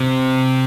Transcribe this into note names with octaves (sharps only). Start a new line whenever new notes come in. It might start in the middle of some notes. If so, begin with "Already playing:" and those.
Already playing: C3